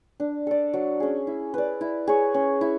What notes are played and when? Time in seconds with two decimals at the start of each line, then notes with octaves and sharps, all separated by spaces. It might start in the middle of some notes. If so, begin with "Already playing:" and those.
0.20 D4
0.47 A4 D5
0.74 F#3
1.00 C#4 G#4
1.27 E4
1.54 B4 D5
1.81 E4
2.07 G#4 C#5
2.34 C#4
2.61 E4